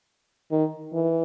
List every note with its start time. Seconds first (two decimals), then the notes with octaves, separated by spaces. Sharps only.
0.51 D#3
0.93 E3